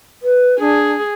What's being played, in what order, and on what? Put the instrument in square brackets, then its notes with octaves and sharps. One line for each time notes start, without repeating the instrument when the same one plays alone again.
[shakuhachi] B4
[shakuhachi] D4 [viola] G#4